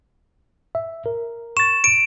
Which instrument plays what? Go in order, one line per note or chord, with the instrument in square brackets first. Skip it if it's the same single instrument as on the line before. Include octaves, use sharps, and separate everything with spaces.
[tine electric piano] E5
A#4
[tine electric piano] C#6 A6 [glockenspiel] E7
[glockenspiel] D7